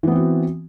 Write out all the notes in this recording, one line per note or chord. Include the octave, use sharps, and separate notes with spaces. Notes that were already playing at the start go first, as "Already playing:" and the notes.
E3 B3 C4 F#4